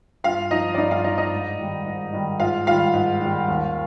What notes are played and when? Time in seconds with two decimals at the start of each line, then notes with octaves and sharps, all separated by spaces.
0.24 G2 F4 F5
0.51 F3 D#4 D#5
0.74 D5
0.77 G2 D#4 D#5
0.91 F4 F5
1.04 F3 D#4 D#5
1.18 D#4 D#5
1.32 G#2
1.59 D#3 G3
1.85 G#2
2.13 D#3 G3
2.39 G#2 F4 F5
2.67 D#3 G3 F4 F5
2.93 G#2
3.20 D#3 G3
3.48 D#2